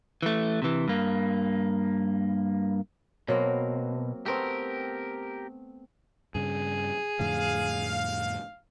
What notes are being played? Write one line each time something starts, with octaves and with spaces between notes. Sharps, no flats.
E3 A3
C3 E3
G2 A#3
B2 F#3 A#3 C4
A3 B3 C4 G4 A#4
G2 C#3 G#4
F2 A2 D3 F5